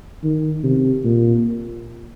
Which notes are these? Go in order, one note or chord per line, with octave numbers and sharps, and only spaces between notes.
D#3
C3
A#2